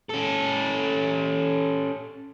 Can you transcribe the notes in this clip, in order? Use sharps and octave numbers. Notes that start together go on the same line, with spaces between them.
C#4 A4